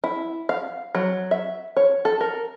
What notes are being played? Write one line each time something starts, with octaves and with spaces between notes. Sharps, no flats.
E4
F5
F#3
E5
C#5
A4
A#4